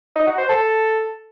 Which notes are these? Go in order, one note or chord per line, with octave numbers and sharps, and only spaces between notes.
D#4
F#4
C5
A4